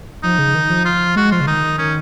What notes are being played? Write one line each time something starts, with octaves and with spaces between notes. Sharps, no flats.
F3 D#4
C#3
D#3
F3
F4
G#3 F#4
F3 F4
C#3
D#3 D#4
D#3
D#3 C#4